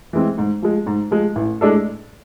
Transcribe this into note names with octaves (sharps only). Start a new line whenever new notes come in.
E3 G#3 C4
G#2
F3 G#3
G#2
F3 G#3
A1
A2 G#3 D4 A4